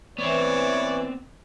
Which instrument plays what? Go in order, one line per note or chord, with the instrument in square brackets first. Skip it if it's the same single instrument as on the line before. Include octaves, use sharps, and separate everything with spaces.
[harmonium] E3 [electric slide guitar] B3 C4 [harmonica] C#5 D5